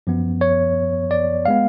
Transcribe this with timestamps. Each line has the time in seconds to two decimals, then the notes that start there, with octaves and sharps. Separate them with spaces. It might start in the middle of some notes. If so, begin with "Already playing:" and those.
0.07 F#2 F3 B3
0.41 C#5
1.11 D5
1.45 G#3 B3 F5